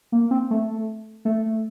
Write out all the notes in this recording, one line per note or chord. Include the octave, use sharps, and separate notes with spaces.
A#3
C4
A3
A3